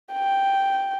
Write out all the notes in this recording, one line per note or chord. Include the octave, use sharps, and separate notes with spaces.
G5